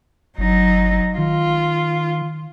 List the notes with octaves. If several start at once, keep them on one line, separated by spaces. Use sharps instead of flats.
G1 F#3 D#4
D#3 F4